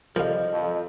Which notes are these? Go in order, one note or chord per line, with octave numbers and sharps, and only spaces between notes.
C2 F3 G3 A4 D#5 F5
F2